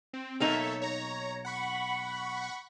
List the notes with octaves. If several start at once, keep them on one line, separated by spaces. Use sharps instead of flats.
C4
B1 A#3 D#4 A4 C#5 E5
C#5 A#5
F#5 B5 C#6